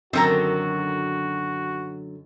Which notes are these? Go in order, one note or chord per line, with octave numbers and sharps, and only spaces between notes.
F#2 D3 D#3 F#3 C4 F#4 A4 A#5